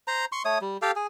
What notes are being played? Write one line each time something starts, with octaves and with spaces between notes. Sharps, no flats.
C5 A#5
C6 C#6
A3 C#5 D#6
G3
G4 A4 F5 G5
G#4